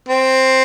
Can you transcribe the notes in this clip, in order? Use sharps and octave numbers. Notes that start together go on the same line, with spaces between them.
C4